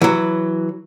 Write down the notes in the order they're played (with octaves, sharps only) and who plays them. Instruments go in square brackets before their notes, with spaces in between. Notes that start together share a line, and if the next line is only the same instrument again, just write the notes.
[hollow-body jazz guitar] E3 F#3